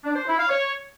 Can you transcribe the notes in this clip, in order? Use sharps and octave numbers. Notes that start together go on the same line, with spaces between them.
D4
C5
E4
F5
C#5